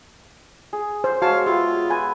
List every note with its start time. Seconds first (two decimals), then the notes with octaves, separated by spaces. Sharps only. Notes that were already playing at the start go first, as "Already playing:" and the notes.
0.73 G#4
1.04 C5
1.22 G#3 F#4 C#5 F5 A5
1.46 B3 F4 G4 E5 F5
1.90 B4 G#5